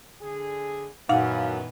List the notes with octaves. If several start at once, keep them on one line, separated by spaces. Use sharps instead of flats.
D3 G#4
F#2 A#2 D#3 E3 B3 D#4 F5 F#5